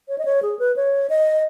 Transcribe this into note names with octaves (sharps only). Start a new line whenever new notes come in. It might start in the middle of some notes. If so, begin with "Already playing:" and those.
C#5
D#5
C#5
G#4
B4
C#5
D#5